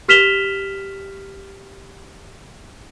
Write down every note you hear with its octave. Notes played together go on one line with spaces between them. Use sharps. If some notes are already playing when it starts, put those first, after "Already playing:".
G4 F6 B6 E7 F7 G7